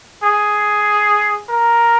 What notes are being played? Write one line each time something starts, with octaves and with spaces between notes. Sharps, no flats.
G#4
A#4